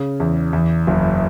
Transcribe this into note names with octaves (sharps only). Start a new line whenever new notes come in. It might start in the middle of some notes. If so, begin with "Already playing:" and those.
Already playing: C#3
E2
E2
F#1